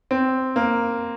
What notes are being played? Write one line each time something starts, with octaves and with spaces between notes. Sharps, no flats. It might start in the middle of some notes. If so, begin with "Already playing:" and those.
C4
A#3